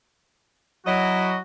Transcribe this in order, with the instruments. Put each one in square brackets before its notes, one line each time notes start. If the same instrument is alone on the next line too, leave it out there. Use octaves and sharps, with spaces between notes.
[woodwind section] F#3 F#4 [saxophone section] E4 D#5